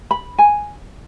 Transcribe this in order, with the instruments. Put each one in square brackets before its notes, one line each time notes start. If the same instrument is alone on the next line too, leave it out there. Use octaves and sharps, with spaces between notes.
[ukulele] B5
G#5